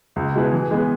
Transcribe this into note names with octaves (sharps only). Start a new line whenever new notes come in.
C#2
B2 G#3 E4 B4
E3
G#3 B3